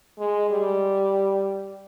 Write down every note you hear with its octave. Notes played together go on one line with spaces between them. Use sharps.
G#3
G3